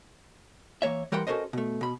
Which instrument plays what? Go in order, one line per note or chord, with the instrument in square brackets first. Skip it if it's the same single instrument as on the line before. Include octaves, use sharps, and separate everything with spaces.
[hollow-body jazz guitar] E3 A#3 C#5 E5
E3 G3 A#4 F#5 G5 C6
C#4 F#4 A4 A#4 C5 D#5
B2 A3
B2 B5